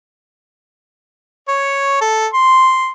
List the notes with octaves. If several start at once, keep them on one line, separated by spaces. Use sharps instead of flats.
C#5
A4
C6